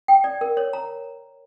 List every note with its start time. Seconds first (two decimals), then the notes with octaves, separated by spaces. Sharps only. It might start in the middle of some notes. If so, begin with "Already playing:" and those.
0.08 G5
0.24 D5
0.41 A#4
0.57 C#5
0.73 A#5